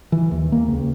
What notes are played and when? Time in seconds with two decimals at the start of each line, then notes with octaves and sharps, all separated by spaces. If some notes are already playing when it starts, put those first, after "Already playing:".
0.12 E3
0.31 D#2
0.52 A#3
0.68 C#2